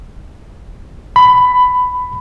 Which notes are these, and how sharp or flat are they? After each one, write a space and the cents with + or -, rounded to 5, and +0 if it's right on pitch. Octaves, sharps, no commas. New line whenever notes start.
B5 +15